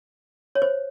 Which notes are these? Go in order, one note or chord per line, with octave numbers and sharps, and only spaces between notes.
C#5
C5